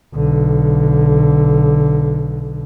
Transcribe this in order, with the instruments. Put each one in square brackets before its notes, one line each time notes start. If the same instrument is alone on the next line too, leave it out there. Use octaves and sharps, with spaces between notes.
[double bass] B1 D3